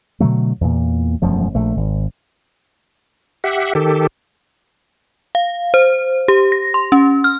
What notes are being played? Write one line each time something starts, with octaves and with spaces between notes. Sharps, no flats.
B2 D3 F#3 A3
E2 A#2
E1 F#2 F3 A3
A#1 A3
G#1
G4 E5 F#5
D#3 G4 A4
F5
C5
G4
A#6
C6
C#4
F6